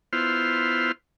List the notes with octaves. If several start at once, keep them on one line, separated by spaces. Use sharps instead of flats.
B3 E4 F4 C5 C6 F6